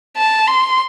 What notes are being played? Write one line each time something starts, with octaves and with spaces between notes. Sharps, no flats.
A5
C6